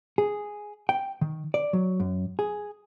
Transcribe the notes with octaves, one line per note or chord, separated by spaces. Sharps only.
G#4
G5
D#3
D5
F#3
F#2
G#4